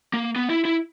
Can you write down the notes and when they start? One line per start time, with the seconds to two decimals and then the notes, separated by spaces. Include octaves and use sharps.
0.13 A#3
0.36 B3
0.50 E4
0.65 E4